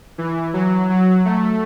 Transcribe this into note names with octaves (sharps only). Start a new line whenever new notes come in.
E3
F#3
F#3
A3